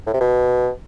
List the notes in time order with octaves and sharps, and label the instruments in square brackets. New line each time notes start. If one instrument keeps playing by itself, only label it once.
[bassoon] A2
C3
B2